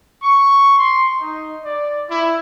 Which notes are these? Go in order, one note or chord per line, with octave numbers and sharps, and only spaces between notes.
C#6
C6
D#4
D5
E4